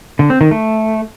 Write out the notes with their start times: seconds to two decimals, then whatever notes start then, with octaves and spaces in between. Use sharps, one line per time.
0.19 D3
0.30 C4
0.41 D#3
0.51 A3